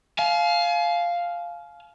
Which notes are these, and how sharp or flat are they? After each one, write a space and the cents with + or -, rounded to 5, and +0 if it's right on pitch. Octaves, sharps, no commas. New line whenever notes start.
F5 +0 G#5 +40